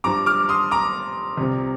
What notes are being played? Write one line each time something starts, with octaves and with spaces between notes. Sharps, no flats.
G2 F3 A#5 D6
D6 F6
C6 D#6
A#5 D6
C2 C3 F3